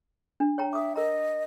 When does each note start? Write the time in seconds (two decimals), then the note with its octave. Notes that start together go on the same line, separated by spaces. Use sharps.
0.40 D4
0.58 C#5 G5 A#5
0.73 E5 D6 D#6
0.96 A#4 D#5 A#5